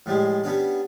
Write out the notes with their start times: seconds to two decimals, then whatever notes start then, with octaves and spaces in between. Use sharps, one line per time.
0.06 A2 F3 G3 G#3
0.44 G3 B3 C#4 D4